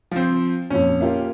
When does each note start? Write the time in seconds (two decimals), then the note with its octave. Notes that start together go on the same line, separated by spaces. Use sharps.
0.11 F3 C4
0.70 F2 A#2 C#4
1.00 A#3 F4 G4